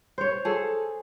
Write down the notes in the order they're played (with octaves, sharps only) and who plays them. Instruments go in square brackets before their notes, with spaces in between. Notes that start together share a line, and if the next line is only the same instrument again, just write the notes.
[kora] C5 C#5
[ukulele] G#4 A4